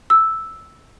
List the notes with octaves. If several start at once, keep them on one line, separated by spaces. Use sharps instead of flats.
E6